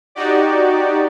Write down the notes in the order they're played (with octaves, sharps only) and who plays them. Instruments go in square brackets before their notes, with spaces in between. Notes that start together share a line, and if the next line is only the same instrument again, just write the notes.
[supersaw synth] D#4 F#4 G4 D5